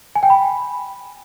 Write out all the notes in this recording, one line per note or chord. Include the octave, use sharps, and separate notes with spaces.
G#5
G5
B5